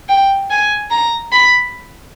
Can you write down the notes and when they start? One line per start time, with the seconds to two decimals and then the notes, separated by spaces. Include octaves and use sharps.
0.09 G5
0.50 G#5
0.91 A#5
1.32 B5